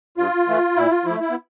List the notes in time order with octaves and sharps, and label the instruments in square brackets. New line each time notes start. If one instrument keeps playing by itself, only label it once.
[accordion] G2 F4
E3 A3
A#2 E4
F4
F3 A3 E4
E4
B3